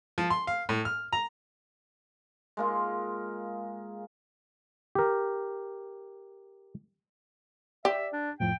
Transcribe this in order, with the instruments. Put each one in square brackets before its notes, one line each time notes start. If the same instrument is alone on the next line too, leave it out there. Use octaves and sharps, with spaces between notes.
[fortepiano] F3
C6
F5
A2
F6
A#5
[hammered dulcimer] G#3 A#3 F4
[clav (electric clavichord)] G4 A#4
[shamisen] G4 [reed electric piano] D5 [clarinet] E5
[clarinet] D4
[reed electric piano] F2 A2 F3 [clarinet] G5